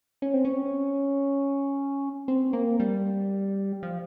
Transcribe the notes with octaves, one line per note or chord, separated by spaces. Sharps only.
C#4
C4
C#4
C4
A#3
G3
F3